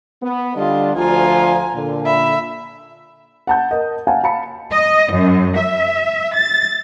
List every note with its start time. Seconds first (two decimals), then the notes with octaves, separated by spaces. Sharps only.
0.22 B3
0.56 D3 G3 D4 F4 D#5
0.95 D2 F3 F4 G#5 A#5
1.74 A#2 D3
2.05 E5 B5
3.47 F#5 A5 G6
3.71 A#4 D#5
4.07 F5 F#5 G#5 A5
4.23 F5 A5 B5 C#7
4.73 D#5
5.12 F#2
5.57 E5
6.35 A6